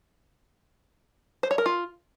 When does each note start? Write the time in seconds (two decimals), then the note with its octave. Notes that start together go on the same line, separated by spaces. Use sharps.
1.43 C5
1.51 C#5
1.58 A#4
1.66 F4